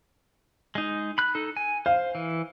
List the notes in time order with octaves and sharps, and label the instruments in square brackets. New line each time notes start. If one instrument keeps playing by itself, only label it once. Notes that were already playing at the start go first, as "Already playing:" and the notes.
[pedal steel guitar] G#3 D#4
B5 F#6
D#4 A4
G#5
[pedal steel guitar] C5 [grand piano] F5
[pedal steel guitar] E3